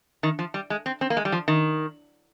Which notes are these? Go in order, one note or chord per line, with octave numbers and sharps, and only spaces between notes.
D#3
F3
G3
G#3
C4
C4
A#3
G#3
G3
F3
D#3